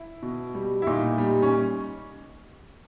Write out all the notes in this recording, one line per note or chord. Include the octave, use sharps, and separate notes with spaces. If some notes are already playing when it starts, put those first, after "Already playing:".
Already playing: E4
B2
G3
E4
A#2 D#4
G3
C#4